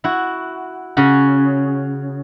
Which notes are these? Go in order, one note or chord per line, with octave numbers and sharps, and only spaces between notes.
E4 F#4
C#3 C#4 F#4